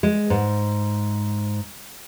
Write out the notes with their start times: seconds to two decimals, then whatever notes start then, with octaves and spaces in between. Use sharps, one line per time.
0.03 G#3
0.30 G#2